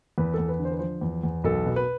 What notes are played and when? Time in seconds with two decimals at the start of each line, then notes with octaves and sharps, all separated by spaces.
0.18 E2 B4
0.34 E2 A4
0.49 B4
0.59 D3
0.65 C5
0.71 B4
0.79 F3 C5
1.01 E2
1.23 E2
1.44 B1 A4
1.66 B2
1.76 B4